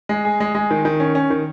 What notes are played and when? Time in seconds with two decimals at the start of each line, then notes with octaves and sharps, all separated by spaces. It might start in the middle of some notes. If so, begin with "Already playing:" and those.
0.09 G#3
0.25 G#4
0.40 G#3
0.55 G#3
0.71 D#3
0.85 D#3
1.00 C#4
1.15 C#4
1.30 D#3